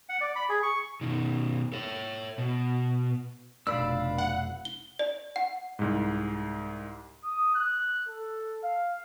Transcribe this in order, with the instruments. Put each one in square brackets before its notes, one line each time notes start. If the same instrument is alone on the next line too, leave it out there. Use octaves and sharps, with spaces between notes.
[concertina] F#5
D5
B5
G#4
C#6
[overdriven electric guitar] B2 D#3
C#5 E5
B2
[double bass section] F1 B1 [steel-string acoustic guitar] D4 [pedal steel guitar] F5 B5 E6
[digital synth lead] F#5
[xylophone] G7
D5
F#5
[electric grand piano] C2 G#2
[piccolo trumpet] D#6
F#6
A4
F5